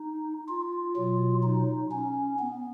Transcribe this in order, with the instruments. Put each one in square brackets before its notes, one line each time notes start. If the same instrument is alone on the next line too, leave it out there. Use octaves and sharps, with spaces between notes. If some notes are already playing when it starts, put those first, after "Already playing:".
Already playing: [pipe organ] D#4
F4
B2 F#3
D#4
C#4
B3